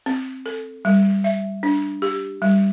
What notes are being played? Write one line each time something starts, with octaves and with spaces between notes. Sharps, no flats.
C4
A4
G3
E5
D4
G4
G3